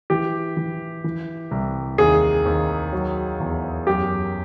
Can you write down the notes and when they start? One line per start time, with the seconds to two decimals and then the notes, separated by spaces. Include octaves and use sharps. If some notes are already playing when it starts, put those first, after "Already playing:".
0.10 E3 G4
0.57 E3
1.04 E3
1.51 C2
1.98 D#2 G#4
2.45 D#2
2.93 F#3
3.40 E2
3.87 F#2 G4